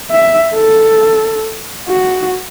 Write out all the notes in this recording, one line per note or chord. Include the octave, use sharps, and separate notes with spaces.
E5
A4
F#4